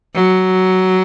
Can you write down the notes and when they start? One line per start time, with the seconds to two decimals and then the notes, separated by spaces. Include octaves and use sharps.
0.14 F#3